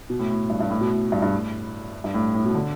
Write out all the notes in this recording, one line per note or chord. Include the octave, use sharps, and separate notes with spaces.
B2
A2
A2
G2
G2
A2
B2
A2
G2
G2
A2
G2
A2
A2
B2
D3